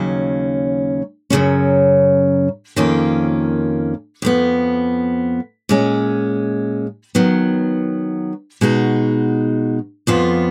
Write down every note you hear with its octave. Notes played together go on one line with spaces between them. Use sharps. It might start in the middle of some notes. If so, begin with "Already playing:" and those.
Already playing: D#2 C#3 F#3 C#4
F#2 C#3 F#3 C#4
F2 D#3 A#3 C#4 F4
F2 F3 B3
A#2 G#3 C#4
D#3 F#3 B3
B2 G#3 D#4 F#4
F2 F3 B3 F4